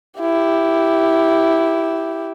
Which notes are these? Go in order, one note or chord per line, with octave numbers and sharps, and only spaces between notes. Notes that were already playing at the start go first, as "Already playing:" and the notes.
E4 G4